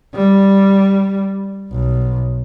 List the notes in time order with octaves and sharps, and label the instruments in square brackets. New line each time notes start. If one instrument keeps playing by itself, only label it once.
[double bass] G3
B1